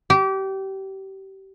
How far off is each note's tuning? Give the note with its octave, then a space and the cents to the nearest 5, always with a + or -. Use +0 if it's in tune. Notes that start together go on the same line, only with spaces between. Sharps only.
G4 -25